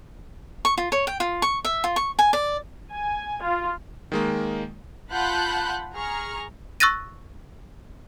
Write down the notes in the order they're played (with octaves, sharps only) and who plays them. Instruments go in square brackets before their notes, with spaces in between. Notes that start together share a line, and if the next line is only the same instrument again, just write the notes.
[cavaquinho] C#6
F4
C#5
G5
F4
C#6
E5
F4
C#6
G#5
D5
[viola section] G#5
F4
[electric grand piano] D#3 G#3 A#3
[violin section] F4 F#5 A5 B5 F#6 G6
G#4 A#5 C#6 F6
[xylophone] C#6 E6 F#6 A6 A#6 D#7